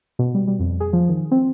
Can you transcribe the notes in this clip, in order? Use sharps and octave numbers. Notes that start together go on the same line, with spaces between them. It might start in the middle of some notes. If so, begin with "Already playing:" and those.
B2
G3
G3
F2
G#4
F3
D#3
C4